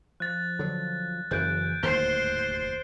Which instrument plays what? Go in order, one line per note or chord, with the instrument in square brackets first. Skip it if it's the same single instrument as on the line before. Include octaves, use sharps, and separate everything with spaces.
[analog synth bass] F3 [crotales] F#6 A6
[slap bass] D3 F#3
[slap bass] F#1 F#2 C#3 [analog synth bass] E3 [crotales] F#6 G6 D7
[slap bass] D1 D#2 D#3 [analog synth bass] G#2 [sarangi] C5 [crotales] C7 G7
[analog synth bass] F1